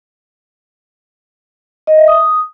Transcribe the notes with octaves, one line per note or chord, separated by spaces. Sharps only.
D#5
E5
D#6